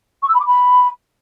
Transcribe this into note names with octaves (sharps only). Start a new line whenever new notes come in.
C#6
E6
B5
D6
B5